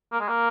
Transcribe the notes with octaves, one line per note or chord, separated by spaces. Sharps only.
A#3
G#3
A#3